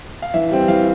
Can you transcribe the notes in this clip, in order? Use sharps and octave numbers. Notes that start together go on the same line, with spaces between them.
F5
E3 E5
G3 C4
E3 F5